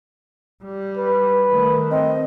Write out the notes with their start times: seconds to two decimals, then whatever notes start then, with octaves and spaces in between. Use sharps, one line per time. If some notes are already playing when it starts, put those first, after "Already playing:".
0.64 G3
0.97 B4
1.50 D#3 A3
1.91 C4 D#5